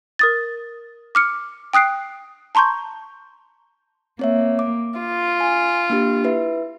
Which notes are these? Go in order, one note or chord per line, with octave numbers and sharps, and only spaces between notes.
A#4 D#6 A6
D6 F6 C#7
G5 D#6 F#6 C7 D7
A5 A#5 C6 C#6 G6
A#3 C4 C#5 E5
D6
F4
G#5
A#3 D4 G4
E4 B4 E5